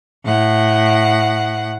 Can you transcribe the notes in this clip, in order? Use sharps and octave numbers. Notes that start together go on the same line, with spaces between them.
A2 F#5